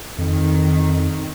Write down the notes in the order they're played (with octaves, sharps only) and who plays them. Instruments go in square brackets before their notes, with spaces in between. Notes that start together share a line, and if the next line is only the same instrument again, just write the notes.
[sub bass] F2 [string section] D#3